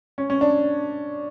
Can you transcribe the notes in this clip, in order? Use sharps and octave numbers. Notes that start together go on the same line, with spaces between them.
C#4
C#4
D4